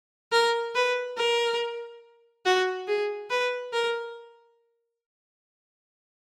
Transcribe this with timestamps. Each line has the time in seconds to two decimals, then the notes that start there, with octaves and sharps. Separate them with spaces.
0.32 A#4
0.75 B4
1.17 A#4
2.46 F#4
2.88 G#4
3.30 B4
3.73 A#4